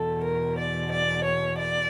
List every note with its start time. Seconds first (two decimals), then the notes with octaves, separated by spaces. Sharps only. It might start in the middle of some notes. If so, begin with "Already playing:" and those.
Already playing: E2 B2 A4
0.26 A#4
0.59 D5
0.93 D5
1.25 C#5
1.59 D5